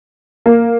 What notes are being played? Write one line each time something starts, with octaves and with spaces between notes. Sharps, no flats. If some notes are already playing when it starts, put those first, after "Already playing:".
A#3